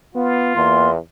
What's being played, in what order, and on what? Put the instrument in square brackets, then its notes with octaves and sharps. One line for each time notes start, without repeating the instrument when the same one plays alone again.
[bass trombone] B3 [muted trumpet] F4
[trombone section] E2 [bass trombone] A#3 [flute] C6